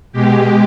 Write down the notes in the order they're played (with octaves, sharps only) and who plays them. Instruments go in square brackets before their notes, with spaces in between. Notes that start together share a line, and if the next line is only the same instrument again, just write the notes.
[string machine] B2 G#3 G4